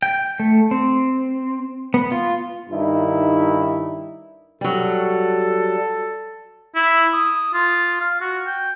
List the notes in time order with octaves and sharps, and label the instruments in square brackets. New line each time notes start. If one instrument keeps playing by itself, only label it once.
[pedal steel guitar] G5
A3
C4
B3
F4
[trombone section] G2 D#3 D#4 E4
[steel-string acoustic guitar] F#3 G3 [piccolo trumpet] A4
[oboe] E4
D#6
F4
F5
F#4
G5